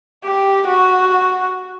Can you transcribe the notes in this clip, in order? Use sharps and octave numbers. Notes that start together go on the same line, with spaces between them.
G4
F#4